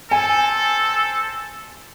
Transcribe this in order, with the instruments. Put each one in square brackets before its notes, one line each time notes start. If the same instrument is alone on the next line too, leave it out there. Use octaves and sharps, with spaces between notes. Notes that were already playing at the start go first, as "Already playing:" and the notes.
[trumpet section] C4 A4 [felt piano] G#5